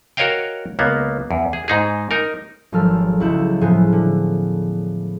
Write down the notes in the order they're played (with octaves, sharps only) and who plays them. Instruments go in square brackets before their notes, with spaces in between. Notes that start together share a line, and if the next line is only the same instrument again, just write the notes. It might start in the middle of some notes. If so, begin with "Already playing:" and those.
[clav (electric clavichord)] F#4 A#4 C#5 D#5 F5 G5
C#2 A#3 B3
E2
G#4
G#2 D#4 G#4
D#4 A#4
[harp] G#1 F3 F#3 A4 F6
C#2 F#3 E4 F#5 G6 E7
A2 E3 F3 B3 G#4 C5
D3